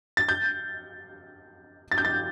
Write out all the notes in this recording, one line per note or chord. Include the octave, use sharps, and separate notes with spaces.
A6
G6
A6
G6
A6